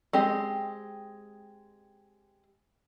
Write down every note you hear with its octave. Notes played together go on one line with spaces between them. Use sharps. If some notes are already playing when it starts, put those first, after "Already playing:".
G#3 C4 G4 D#5